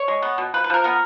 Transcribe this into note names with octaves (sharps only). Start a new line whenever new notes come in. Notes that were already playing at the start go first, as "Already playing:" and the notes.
Already playing: C#5
G#3
B3
B2
F3 B4
B4
F3 A#4
B3 A#4